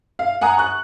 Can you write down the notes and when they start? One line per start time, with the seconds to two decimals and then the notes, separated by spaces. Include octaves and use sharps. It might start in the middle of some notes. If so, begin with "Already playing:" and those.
0.19 F5
0.41 F#5 G#5 A#5 D#6
0.57 C#6 F#6